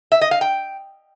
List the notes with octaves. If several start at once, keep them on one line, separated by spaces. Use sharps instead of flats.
E5
D#5
F5
G5